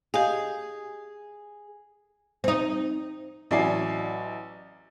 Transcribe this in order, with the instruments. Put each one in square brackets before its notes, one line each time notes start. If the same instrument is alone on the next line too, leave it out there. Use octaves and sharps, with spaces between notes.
[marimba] G4 D#5 F5 [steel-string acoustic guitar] G#4
[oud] C4 D#4
[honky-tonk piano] A1 F#3 E4 D5 G#5 C7